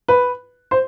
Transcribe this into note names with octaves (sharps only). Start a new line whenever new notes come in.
B4
C5